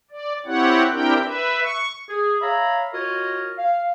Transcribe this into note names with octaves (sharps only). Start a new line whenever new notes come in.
D5
C4 E4 G4 C#5 F#5
C4 D4 E4 G4 A#4 G5
B4 E5
C#6
G#4
C#5 E5 F5 A#5 B5
F4 F#4 A#4 C#5 D#5
F5